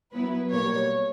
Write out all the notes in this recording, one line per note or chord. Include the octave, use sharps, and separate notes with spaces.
F#3 B3 E4 B4
B2 G3 A#3 C#5